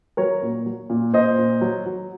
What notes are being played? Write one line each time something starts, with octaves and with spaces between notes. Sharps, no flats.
F#3 A#4 C#5
A#2
F#3
A#2
A#2 C5 D#5
A#2
F#3
F#3